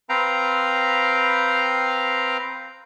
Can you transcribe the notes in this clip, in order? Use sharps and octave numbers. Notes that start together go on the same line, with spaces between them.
C4 B4 F5 G5 A#5